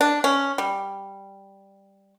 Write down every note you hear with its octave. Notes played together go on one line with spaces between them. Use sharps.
D4
C#4
G3